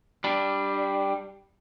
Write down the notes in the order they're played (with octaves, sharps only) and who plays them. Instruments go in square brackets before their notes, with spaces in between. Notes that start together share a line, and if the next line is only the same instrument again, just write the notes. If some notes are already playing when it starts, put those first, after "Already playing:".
[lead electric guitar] G3 D4